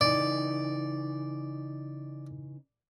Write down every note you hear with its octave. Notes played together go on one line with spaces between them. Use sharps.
C#3 E3 D#4 D5